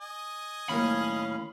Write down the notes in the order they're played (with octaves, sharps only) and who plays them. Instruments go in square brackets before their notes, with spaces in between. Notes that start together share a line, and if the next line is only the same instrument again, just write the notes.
[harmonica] D#5 G#5
[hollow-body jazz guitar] D#2 A2 A#3 [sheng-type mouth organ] C#4 F5 [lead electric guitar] B5